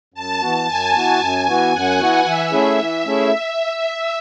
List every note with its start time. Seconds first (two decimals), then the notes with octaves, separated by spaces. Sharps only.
0.14 F#2 A5
0.41 E3 B3 F#4
0.66 F#2 G#5
0.93 E3 B3 F#4
1.20 F#2
1.47 E3 B3 F#4
1.73 F#2 F#5
1.99 E3 B3 F#4
2.25 E3 E5
2.52 A3 C#4 E4 G#4
2.78 E3
3.05 A3 C#4 E4 G#4